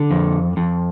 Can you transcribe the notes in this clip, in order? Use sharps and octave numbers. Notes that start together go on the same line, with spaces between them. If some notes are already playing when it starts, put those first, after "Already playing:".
Already playing: D3
F2
F2